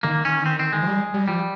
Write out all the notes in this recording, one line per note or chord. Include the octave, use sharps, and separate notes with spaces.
D#3 A#3
C#4
C4
C4
G#3
F3
G3
G3
F3 G3